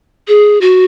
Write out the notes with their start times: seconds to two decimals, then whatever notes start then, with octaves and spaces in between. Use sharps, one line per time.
0.28 G#4
0.61 F#4